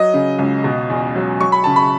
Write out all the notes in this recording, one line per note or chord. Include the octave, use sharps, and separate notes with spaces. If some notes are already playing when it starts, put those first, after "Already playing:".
Already playing: F#3 D#5
C#3
C#2
B2
E2
F#3
F#3 C#6
B5
C#3 A5
B5